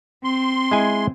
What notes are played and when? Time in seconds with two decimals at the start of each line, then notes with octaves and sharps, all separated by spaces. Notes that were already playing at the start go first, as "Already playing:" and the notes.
0.24 C4 C6
0.71 G#3 E4 G#5